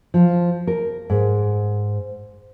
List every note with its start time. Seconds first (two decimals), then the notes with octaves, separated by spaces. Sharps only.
0.14 F3
0.67 A#4
1.10 G#2